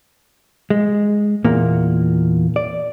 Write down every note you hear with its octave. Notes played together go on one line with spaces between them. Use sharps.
G#3
E2 A#2 A#3
D5